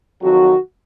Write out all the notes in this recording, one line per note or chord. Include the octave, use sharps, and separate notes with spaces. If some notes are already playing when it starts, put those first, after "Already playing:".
F2 D#3 F#3 F#4